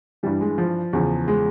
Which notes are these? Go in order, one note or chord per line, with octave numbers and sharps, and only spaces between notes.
G2 E3 G3
G#3
F3
E2 C#3 F3
G#3